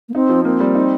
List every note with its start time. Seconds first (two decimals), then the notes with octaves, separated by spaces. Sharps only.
0.09 A#3
0.14 C4 D#4
0.29 F3
0.45 A#3 C4
0.60 G3
0.75 D#4